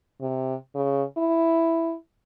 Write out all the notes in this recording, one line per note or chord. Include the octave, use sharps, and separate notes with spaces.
C3
C#3
E4